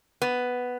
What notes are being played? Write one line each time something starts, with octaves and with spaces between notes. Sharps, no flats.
B3